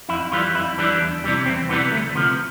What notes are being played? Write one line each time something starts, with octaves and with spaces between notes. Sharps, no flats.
F2 E4
E3 G3 F4
F2 E4
E3 G3 D4
E2
C3 E3 G3
E2 C4
C3 E3 G3 B3
D2 A3
C3 F3 B3